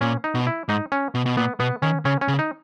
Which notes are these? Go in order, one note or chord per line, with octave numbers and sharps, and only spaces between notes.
A#2 C#4
D#4
B2
E4
G#2 D#4
C#4
B2
B2
A#2 B3
B2 B3
D#3 C#4
C#3 C#4
C#4
C#3
D#4